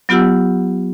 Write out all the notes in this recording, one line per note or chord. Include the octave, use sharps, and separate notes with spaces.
F#3 B3 F4 G4 F#5 E6